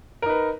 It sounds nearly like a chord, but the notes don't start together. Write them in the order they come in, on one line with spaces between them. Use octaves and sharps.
A#4 D#4 B4